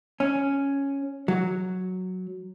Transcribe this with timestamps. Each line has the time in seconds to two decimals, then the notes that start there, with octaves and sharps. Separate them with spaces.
0.20 C#4
1.28 F#3